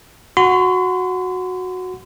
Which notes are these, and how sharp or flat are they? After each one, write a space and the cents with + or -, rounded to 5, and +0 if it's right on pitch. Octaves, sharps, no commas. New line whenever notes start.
F#4 -10 C6 -40